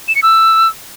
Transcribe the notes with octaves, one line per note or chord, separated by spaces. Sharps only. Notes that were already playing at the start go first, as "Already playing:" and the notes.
E7
C#7
E6